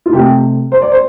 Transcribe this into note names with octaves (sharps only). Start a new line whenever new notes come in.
F4
C3 A3 C4 G4
C5
D5
C5